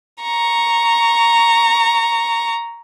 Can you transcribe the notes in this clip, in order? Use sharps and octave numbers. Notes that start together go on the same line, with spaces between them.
A#5 C#6